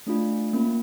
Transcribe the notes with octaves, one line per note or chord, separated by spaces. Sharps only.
A3 D4 F4
A#3 C#4 F4